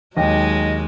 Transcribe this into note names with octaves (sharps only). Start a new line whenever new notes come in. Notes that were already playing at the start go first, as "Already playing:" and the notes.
D#2 F#3 G#3 D#4 D#5 G5